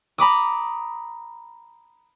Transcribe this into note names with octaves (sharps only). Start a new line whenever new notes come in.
A#5 B5 D6 D#6